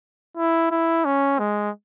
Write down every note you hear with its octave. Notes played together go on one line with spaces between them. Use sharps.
E4
E4
C#4
G#3